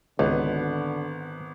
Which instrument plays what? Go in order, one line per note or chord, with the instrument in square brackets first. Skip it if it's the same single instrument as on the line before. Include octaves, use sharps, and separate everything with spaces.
[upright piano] G#1 B3 [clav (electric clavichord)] C#2 [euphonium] D3